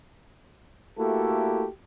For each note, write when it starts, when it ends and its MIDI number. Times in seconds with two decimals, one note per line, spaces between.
0.99 1.68 57
0.99 1.68 58
0.99 1.68 64
0.99 1.68 66
0.99 1.68 67
0.99 1.68 69